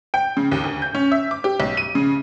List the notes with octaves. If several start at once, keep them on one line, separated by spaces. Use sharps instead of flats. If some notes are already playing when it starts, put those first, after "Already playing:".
G5
C#3
D#2
D2
G6
C#4
E5
D6
G4
B1
D#7
C#3